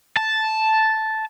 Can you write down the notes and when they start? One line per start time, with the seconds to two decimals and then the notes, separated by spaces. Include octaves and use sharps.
0.17 A5